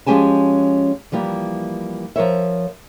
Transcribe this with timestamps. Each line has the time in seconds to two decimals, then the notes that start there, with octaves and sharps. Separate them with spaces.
0.06 F3 G#3 C#4 G4 G#5 A5
1.12 E3 F3 G3 A#3
2.16 F3 A#4 C#5 E5